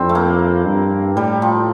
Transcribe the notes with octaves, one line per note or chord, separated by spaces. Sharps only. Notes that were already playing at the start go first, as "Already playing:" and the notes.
Already playing: F2 C4 D4 E4
A3
A#3
G2
A2 G3
F3